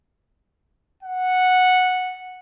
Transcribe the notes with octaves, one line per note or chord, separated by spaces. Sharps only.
F#5